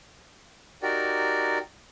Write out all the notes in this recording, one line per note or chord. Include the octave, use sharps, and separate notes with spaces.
D#4 F#4 G4 A#4 D5